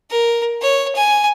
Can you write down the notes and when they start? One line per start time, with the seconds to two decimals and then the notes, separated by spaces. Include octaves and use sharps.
0.11 A#4
0.61 C#5
0.96 G#5